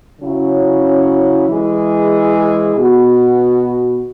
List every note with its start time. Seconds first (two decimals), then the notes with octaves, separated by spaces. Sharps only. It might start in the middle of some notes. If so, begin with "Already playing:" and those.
0.21 C#3 F#3 C#4 E4
1.48 E3 G#3 E4 G#4
2.75 B2 B3 F#4